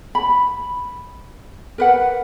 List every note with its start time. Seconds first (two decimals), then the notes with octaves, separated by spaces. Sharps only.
0.15 B5
1.78 A#4 B4 F#5